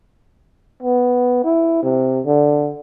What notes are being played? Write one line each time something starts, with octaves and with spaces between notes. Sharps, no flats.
B3
E4
C3
D3